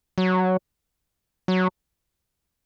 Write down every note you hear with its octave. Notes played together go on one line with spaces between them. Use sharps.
F#3
F#3